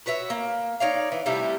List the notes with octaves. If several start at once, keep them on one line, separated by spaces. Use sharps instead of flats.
F#4 B4 C#5 E5
A#3
D#4 C#5 D5 F5
E3
C3 G3 A3 E4